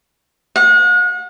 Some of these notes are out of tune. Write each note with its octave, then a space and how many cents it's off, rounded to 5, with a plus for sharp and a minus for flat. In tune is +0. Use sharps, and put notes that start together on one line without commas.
F#5 -40